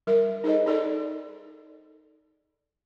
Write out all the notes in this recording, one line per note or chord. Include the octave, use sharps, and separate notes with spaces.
G3 A#4 E5
D#4 G#4 A4 C5 D#5
D#4 A4 D5